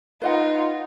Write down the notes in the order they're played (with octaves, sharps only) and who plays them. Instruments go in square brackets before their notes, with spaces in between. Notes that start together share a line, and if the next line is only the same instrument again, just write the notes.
[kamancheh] D#4 F4 [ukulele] B4 D#5 F#5